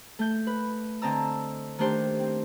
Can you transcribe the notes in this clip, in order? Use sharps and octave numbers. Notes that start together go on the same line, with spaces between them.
A3 G6
B4
D3 C4 D#5 A5 A#5 E6
D#3 A3 D4 G4 C5
C4